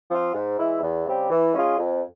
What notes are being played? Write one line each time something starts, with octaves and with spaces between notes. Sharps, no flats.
F3 C4 F4
G#2
E3 G#3 E4
E2
C#3 G3 C4 G4
E3
G#3 C#4 F4 G#4
F2